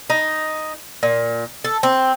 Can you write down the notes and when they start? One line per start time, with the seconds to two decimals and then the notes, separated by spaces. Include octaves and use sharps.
0.10 D#4
1.03 A#2
1.64 A4
1.83 C4